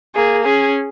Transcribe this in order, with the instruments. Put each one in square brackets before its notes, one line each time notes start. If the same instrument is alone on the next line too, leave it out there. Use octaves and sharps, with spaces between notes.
[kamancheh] A#3 [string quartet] G#4
[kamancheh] C#4 [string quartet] G#4